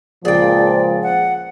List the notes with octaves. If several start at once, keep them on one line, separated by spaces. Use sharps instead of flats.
C#2 A#2 F3 G#4 D5 G5
F#5